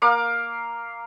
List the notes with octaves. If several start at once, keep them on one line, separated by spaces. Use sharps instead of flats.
A#3 F5 D6